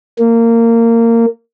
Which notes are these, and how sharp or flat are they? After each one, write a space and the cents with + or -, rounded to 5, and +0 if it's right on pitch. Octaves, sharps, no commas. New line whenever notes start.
A#3 -20